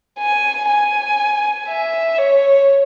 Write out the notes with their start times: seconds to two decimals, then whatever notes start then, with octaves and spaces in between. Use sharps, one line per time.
0.19 G#5
0.70 G#5
1.69 E5
2.18 C#5